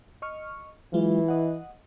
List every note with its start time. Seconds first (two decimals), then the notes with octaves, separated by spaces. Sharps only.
0.22 D#5 C#6 F6
0.93 E3 F#3 G#3 F4
1.28 D#5 F#5